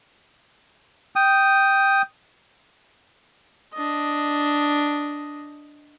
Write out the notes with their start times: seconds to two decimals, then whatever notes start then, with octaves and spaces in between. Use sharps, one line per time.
1.16 G5 D#6
3.74 D4 D#5